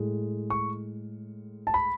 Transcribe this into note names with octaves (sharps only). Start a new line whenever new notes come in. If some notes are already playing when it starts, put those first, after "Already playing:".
Already playing: A2 G#3
C#6
A5
B5